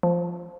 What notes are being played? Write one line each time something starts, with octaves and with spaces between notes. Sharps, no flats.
F3